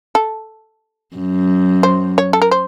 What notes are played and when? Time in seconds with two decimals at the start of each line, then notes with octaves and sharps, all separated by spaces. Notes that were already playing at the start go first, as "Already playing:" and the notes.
0.15 A4
1.16 F#2
1.83 C5
2.18 C#5
2.33 A4
2.42 A#4
2.51 C5